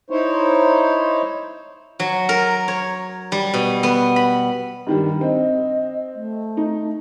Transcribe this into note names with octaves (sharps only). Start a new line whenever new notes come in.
D#4 E4 C5 C#5
F#3
A#4
C#5
G3
B2
B3
B5
G2 D#3 G3
C4 D#5
A3
D#4